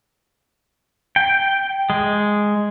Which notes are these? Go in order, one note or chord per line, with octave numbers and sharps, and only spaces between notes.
G5
G#3